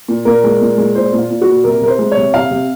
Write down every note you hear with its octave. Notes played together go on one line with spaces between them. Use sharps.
A#2
A#2 A#4
G#3
A#2
G#3
A#2 C5
A#2
F4
A#2
F#4
A#2
C3 A#4
C3 A#4
C5
G#3
C#5
C3
C3 F5
C3